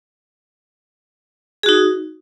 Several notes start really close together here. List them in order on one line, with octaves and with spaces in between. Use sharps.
G#4 F#4 D#4